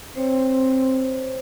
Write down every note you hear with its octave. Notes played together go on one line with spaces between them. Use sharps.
C4 C5 C#5